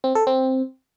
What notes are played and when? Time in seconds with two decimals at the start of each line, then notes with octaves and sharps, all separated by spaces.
0.04 C4
0.15 A4
0.27 C4